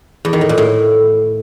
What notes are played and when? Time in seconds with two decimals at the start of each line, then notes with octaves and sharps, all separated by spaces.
0.25 E2
0.33 D#3
0.41 A2
0.49 A#2
0.58 A2